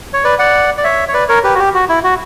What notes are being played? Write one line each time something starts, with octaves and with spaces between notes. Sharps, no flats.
C#5
B4 D5
D5 F#5
D5
C#5 E5
C#5
B4 D5
A#4 C#5
G4 B4
F#4
G4
F#4
E4
F#4